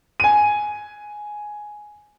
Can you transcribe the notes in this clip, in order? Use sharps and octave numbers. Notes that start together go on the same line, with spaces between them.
G#5 D#7